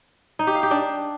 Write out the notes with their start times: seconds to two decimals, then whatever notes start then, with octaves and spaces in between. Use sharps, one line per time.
0.39 D#4
0.47 G4
0.55 F5
0.63 G4
0.71 D4